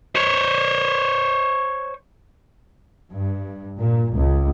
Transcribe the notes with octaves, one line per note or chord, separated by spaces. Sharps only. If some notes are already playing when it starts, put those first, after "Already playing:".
C5 C#5
G2
A#2
C#2